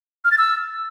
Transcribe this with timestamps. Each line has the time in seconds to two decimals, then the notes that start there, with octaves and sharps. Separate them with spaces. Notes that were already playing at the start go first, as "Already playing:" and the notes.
0.25 F6
0.31 A6
0.38 E6